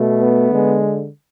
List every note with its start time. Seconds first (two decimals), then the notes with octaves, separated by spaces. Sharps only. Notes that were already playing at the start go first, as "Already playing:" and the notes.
Already playing: B2 A3
0.21 B3
0.50 D3 G#3